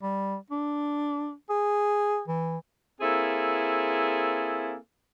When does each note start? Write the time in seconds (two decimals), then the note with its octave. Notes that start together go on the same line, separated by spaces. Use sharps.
0.02 G3
0.51 D4
1.50 G#4
2.28 E3
3.00 A#3 C4 E4 G#4 A4